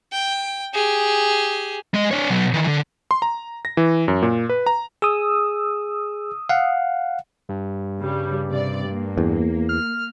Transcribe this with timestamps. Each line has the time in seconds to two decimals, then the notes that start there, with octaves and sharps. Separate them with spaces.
0.12 G5
0.74 G4 G#4
1.94 G#3 D#5
2.11 D4 C#5
2.30 B2 F#3
2.53 D#3 E3
2.67 D3
3.11 C6
3.22 A#5
3.65 A#6
3.77 E3
4.08 F#2
4.23 A#2
4.49 B4
4.66 A#5
5.02 G#4 D#6 E6
6.49 F5 F#5
7.49 G2
8.01 C#3 G3
8.49 C3 D5
8.86 A#3
9.18 E2
9.69 F6